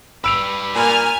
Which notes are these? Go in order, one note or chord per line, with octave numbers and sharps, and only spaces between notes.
G3 B4 E6 D7 F7
A#2 G#5 F6